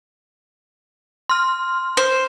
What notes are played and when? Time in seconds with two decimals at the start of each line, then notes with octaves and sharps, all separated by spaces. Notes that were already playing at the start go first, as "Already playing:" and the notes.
1.29 C6 F6
1.97 C5